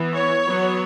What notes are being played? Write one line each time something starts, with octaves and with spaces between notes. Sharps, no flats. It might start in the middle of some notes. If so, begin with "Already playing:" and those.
Already playing: E3 B3
C#5
F#3 B3